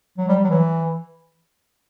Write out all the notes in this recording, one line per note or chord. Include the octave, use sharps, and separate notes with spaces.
F#3
G3
F#3
E3